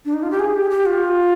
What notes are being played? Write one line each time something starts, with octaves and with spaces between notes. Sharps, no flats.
D4
D#4
F4
G4
G#4
G4
G4
F4